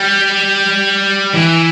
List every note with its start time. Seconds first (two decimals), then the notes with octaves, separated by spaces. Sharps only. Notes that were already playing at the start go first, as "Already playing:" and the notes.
Already playing: G3
1.34 E3